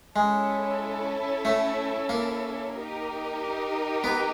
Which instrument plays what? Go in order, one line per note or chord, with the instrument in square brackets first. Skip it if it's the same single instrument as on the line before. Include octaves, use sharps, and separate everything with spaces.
[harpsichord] G#3 [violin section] C#4 E4 A4
[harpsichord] A3
A#3
[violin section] D#4 G4 A#4
[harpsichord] B3